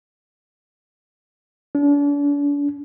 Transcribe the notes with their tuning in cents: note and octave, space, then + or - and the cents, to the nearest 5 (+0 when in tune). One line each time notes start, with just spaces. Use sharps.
D4 -40